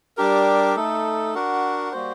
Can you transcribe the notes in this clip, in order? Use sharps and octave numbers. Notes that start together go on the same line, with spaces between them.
G3 D4 G4 A#4
A3 D#4 A4
D4 F#4 A#4 F#5
G3 A#3 F#4 C5